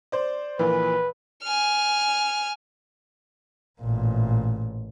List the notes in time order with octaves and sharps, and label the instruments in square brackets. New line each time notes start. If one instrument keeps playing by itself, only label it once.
[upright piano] C5 D5
[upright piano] A#1 A#2 E3 [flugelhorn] B4
[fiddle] G#5 F6
[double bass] A1 A#2